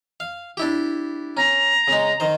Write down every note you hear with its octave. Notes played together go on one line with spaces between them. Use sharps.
F5
D4 E4 G4
C#4 A#5
C#3 G#3
D#3 C5